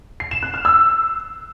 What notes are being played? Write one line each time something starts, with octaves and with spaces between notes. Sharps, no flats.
C7
E7
F#6
F6
E6